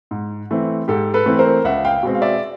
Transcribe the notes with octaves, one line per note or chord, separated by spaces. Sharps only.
G#2
E3 A3 C4
G#2 G4 A4
A4 B4
E3 A3 C4
A#4 C5
C#2 E5 F#5
F5 G5
B2 G#3 C4
F5
D5 E5